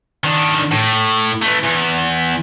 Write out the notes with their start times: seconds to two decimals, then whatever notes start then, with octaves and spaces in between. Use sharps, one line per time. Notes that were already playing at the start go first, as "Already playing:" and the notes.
0.24 D#3 D4
0.71 A2
1.42 E3 A3
1.64 E2